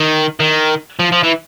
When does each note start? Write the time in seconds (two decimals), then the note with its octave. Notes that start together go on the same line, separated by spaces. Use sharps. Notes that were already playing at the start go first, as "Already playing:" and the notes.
Already playing: D#3
0.40 D#3
0.99 F3
1.12 F3
1.23 E3